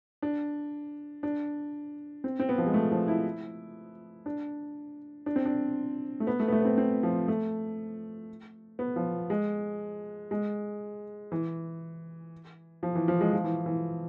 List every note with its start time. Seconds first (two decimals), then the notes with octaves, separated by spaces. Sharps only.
0.22 D4
1.23 D4
2.24 C4
2.40 C4
2.49 B3
2.58 F3
2.67 G#3
2.74 A3
2.91 F3
3.08 E4
4.26 D4
5.26 D4
5.36 C4
5.45 D4
6.20 A3
6.27 B3
6.40 A3
6.48 B3
6.52 A3
6.60 B3
6.65 C4
6.78 C4
7.03 F3
7.28 A3
8.79 B3
8.96 F3
9.30 G#3
10.31 G#3
11.32 E3
12.83 F3
12.95 E3
13.08 F3
13.21 G#3
13.33 F3
13.44 E3
13.66 E3